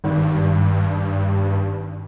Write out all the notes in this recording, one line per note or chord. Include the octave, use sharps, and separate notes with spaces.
G#1 G2